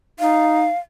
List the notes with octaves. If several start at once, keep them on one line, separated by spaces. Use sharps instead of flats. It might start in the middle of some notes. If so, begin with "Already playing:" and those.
D#4 F5